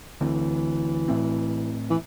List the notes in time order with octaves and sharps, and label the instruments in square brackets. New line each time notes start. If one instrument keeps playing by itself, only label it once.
[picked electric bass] D2 D3 C4 [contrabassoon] E3
[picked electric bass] A2 A3 C4
[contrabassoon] E3